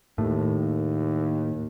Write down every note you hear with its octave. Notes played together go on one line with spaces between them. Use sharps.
D#2 A2